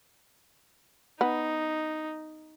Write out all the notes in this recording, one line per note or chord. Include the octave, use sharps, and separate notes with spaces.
B3 D#4